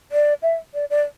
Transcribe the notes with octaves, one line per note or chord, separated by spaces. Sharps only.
D5
E5
D5
D5